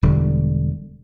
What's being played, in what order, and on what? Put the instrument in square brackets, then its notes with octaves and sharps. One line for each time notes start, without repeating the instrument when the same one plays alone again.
[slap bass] E1 D3 G3